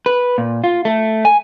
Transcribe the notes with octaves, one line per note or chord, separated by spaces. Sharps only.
B4
A#2
F4
A3
G#5